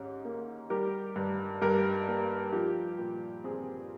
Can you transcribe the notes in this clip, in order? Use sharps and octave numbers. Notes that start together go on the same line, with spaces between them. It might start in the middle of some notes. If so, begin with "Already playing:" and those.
Already playing: G#2 C#4 G4 G#4
A#3
G3 G4 A#4
G2
G2 G4 A#4
A#3
F3 G4
A#2
C4 G#4